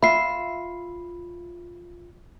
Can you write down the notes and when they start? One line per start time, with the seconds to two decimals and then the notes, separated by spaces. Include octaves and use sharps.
0.03 F4 E5 B5 C7